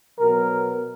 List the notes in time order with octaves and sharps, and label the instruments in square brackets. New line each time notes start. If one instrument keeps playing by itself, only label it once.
[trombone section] B2 F#3 B3 A#4